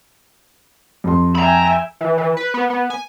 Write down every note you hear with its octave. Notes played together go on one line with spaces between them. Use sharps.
F2 C6
E5 G5 G#5 A#5 B5
E3
E3
B4
B3
B3
G#5